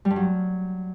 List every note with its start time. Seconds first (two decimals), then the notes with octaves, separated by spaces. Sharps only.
0.05 G3
0.11 G2
0.16 F#3